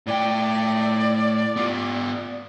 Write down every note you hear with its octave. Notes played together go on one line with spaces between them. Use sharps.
A2 D5 G5
B3 F4